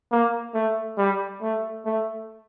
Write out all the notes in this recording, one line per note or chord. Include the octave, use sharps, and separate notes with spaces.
A#3
A3
G3
A3
A3